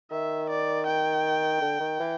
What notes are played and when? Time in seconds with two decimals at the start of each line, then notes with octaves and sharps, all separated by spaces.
0.11 D#3 E5
0.50 D5
0.86 G5
1.61 D3
1.80 D#3
2.00 E3